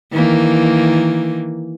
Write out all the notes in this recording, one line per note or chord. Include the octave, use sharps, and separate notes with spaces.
D#3 E3 A#3